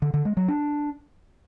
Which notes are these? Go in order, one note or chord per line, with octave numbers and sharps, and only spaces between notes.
D3
D3
G#3
F#3
D4